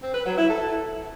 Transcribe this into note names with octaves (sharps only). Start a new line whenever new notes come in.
C4
B4
F#3
E4
A4